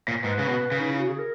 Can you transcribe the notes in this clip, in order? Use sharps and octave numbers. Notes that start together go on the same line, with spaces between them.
A#2
G#2 B4
C#3
B2
C#3
D#4
E4
F#4
G#4
A#4